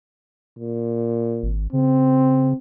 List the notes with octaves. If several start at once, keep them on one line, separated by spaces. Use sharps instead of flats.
A#2
G#1
C#3 C4